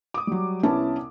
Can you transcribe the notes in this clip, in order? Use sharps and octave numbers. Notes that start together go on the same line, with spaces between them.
D6 D#6
F#3 G3
C2 B3 C#4 E4 A5